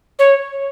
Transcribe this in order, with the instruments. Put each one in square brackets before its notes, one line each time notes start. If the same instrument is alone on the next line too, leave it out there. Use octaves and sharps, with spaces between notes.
[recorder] C#5